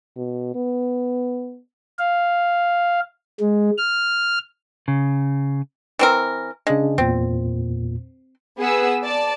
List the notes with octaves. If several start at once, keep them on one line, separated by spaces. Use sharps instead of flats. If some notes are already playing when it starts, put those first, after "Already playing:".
B2
B3
F5
G#3
F6
C#3
E3 C4 A#4
C#3 G#3 D4
E2 A#2 C4
B3 G#4 B4 F#5 E6
D5 A5